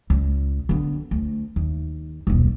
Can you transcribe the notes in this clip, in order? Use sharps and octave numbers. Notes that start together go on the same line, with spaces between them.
C#2
D3 B3
D2
D#2
D#1 B1